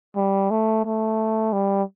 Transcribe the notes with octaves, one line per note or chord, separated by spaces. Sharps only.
G3
A3
A3
G3